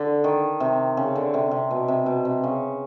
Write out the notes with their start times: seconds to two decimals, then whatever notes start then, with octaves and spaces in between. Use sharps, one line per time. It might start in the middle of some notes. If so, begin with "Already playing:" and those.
Already playing: D3
0.24 D#3
0.60 C3
0.97 C#3
1.16 D3
1.34 C3
1.51 C3
1.71 B2
1.88 C3
2.06 B2
2.25 C3
2.43 C#3